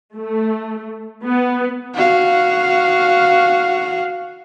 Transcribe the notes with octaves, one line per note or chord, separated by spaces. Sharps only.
A3
B3
F#4 F5